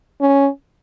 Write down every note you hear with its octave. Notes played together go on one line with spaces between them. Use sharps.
C#4